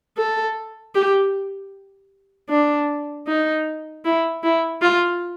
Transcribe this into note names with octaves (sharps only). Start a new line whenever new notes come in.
A4
G4
D4
D#4
E4
E4
F4